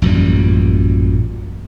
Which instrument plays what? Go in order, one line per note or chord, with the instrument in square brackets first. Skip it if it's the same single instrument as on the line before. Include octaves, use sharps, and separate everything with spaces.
[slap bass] A1 F#2 A#2 G3